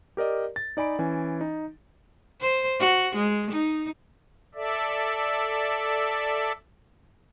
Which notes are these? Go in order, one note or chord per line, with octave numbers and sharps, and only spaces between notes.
G4 A#4 D5 D#5
A6
D#4 D5 G#5 B5 D7
E3 C#4 G#5
D#4
C5
F#4
G#3
D#4
A4 D5 E5